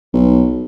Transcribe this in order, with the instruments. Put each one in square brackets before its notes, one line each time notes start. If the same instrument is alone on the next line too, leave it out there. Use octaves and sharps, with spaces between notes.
[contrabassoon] B1